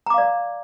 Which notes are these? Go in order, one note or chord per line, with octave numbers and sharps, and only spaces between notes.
D5 F5 A#5 D6